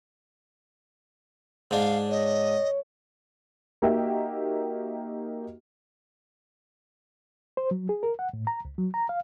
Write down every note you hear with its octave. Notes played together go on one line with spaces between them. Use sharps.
G#2 D4 F5
C#5 D#5
A#3 D#4 F#4 G4 E5 G5
C5
F#3
G#4
A#4
F#5
A2
A#5
C#2
F#3
A#5
F5